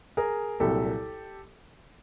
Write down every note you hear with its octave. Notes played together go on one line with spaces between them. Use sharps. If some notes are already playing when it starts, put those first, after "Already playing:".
G#4 A#4
C2 A#2 F#3 G4 A4